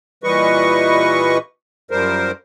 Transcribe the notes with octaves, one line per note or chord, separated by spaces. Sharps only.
A#2 E3 G3 B4 D#5 C#6
F#2 F3 G3 A#4 C5